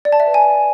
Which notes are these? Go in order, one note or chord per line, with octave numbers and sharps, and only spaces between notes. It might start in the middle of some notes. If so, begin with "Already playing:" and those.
D5
A5
E5
B4
G#5